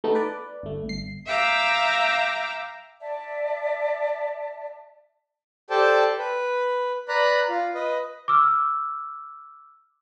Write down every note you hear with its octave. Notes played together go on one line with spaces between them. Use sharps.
A3 B3 D#4
B4 D5
G1 A3
G1 C7
E5 F5 G5 A#5 D6 E6
D5 E5 A5
G4 A4 C5 D5 G5 A5
B4
B4 D5 A#5 B5 F#6
F4
B4 D#5
D6 E6 F6